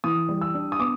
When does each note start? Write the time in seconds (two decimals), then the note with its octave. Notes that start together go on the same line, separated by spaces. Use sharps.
0.04 E3 D#6
0.29 G3
0.41 E6
0.54 D4
0.72 D#6
0.79 B3 D6